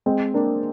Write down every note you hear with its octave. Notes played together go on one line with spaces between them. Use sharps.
G#3 C4
A#3 D4